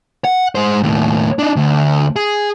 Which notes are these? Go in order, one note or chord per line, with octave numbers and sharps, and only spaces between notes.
F#5
G#3 C5
D#2 A2
D4 D#4
D2
G#4